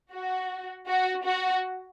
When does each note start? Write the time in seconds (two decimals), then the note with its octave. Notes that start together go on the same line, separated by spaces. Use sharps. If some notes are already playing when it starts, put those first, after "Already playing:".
0.14 F#4
0.88 F#4
1.26 F#4